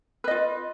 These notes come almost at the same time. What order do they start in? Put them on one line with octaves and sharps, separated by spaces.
B4 D#5 F4